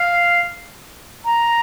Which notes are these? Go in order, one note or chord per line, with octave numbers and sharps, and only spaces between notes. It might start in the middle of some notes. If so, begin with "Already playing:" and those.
Already playing: F5
A#5